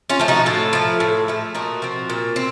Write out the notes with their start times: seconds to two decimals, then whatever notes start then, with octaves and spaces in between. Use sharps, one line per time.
0.10 C#4 F4
0.19 F3 A3
0.28 D#4 F#4
0.46 A2 F4 A4
0.73 F3 A3
1.00 A2
1.28 F3 A3
1.55 A#2 D#4 F#4
1.82 F3 C4
2.10 A#2
2.36 C4